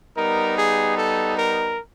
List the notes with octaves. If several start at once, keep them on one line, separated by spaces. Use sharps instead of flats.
G3 B3 D#4 A#4
G#4
A4
A#4